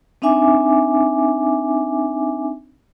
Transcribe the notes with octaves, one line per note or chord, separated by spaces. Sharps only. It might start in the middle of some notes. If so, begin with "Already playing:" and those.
C4 D4 D#4 E5 G#5 D6